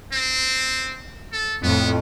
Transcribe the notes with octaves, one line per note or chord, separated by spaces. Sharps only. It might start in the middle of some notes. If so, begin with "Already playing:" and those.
C4
A4
F2 A2 B3